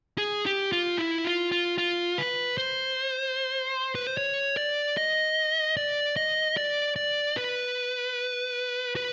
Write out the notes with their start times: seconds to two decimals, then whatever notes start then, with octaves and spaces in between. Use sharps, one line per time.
0.18 G#4
0.46 G4
0.72 F4
0.98 E4
1.24 F4
1.52 F4
1.78 F4
2.18 B4
2.58 C5
3.95 B4
4.07 C5
4.17 C#5
4.57 D5
4.97 D#5
5.77 D5
6.16 D#5
6.57 D5
6.96 D5
7.37 B4
8.96 B4